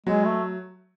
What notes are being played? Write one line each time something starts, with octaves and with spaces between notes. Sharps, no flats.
F#3 G#3
A3